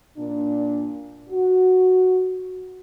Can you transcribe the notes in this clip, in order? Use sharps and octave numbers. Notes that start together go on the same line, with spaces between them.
A#2 D4
F#4